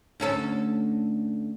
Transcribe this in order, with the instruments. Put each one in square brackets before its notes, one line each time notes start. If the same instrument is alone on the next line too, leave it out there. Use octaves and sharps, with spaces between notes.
[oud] D2 C#4 A4